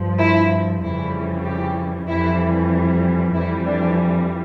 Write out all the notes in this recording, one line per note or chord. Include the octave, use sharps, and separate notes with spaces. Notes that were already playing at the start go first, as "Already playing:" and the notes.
Already playing: G2 F3
E4
F2 C#3 E3 G3 E4
G4
F2 E3 G3 E4
F2 E3 G3 E4
D4